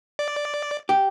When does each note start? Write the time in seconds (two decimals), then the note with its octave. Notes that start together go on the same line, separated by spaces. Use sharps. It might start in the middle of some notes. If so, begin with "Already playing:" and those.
0.19 D5
0.89 G4